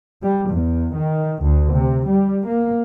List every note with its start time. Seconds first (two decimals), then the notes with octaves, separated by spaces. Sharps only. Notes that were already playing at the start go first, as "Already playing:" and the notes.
0.23 G3
0.52 E2
0.96 D#3
1.43 D2
1.74 C3
2.08 G3
2.46 A#3